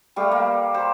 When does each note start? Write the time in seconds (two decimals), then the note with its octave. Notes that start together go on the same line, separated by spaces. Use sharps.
0.16 G3 A3 G4 F5
0.32 A#3
0.74 G4 C5